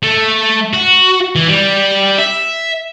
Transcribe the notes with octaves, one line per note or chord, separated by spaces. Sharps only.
A3
F#4
E3
G3
E5